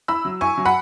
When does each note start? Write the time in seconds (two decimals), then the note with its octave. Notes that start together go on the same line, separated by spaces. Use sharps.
0.08 E4 B5 E6
0.25 F#3
0.41 E4 G#5 C#6
0.58 F#3
0.65 F#5 B5